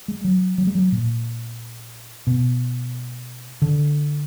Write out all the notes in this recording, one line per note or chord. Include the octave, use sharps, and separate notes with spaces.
G#3
F#3
F#3
G#3
F#3
A#2
B2
D3